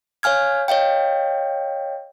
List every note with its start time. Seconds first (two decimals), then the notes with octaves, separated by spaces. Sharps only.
0.23 C#5 F5 G#5 F6 G#6
0.68 C#5 D#5 F5 G5